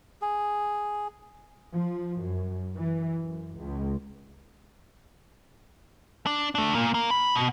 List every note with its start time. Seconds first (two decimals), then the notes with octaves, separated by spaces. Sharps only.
0.21 G#4
1.74 F3
2.21 F#2
2.77 E3
3.22 F#2
3.59 C#2
6.27 D4
6.55 A3 D4
6.74 A#2 A#3
6.94 A#3
7.11 B5
7.35 B2